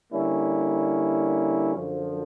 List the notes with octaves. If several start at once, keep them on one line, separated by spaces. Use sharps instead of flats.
D3 G3 A#3 C#4 E4
F#2 D3 F3